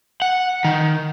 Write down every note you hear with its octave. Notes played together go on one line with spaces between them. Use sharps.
F#5
D#3